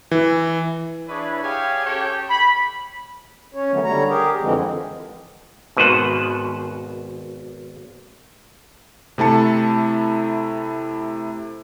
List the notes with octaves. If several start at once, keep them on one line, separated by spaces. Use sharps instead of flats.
E3
D4 E4 G#4 B4 C#5
G4 G#4 C#5 F5 G5 G#5
C#4 G4 A4 C#5 G5
B5
C#4 C#5
D3 D#3 F#3 A3 B3
D3 G3 C#5 A#5
G4 G#4 A#4
F2 D3 E3 F3 G#3 C4
G#1 B2 D#3 B4 C5 F#5
C3 A3 E4 A5 C#7